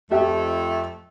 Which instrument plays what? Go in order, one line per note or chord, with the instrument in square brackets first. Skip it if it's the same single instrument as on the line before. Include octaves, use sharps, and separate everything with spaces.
[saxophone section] F2 A3 [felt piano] G4 E5 G5